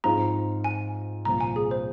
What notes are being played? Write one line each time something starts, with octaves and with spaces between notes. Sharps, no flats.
G#2 F3 C4 F4 A#5
G#5
C2 A#2 F3 A#5
G#5
G#4
C5